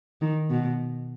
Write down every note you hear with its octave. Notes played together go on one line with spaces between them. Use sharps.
D#3
B2